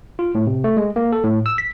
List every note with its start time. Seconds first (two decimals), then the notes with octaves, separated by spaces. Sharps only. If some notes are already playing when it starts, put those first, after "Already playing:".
0.19 F4
0.35 A2
0.47 C3
0.64 A3
0.77 G#3
0.96 A#3
1.12 A4
1.24 A2
1.46 E6
1.58 B6